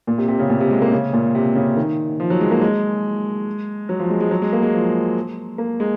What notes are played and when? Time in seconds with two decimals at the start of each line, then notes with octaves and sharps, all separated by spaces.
0.07 A#2
0.18 C3
0.28 C3
0.39 C#3
0.50 A#2
0.60 C3
0.71 G#3
0.82 A#3
0.92 C#3
1.13 A#2
1.35 C3
1.55 C#3
1.77 D#3
2.20 F3
2.30 F#3
2.41 G#3
2.51 A#3
2.61 G#3
3.89 F#3
3.99 F3
4.10 G#3
4.20 G#3
4.31 F#3
4.42 G#3
4.53 A#3
4.63 G#3
4.74 F3
5.58 A#3
5.80 G#3